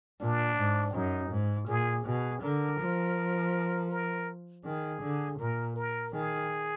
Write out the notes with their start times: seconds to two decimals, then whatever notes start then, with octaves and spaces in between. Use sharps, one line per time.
0.20 A#2 D4
0.57 G#2
0.95 F#2 D#4
1.31 G#2
1.68 A#2 G#4
2.05 B2 G#4
2.43 D3 A#4
2.80 F3
3.91 A#4
4.65 D#3 G#4
5.02 D3
5.39 A#2 A#4
5.76 A#4
6.13 D#3 G#4